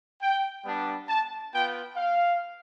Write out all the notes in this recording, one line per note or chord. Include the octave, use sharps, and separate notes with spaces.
G5
G3 B3 D4
A5
B3 F4 G5
F5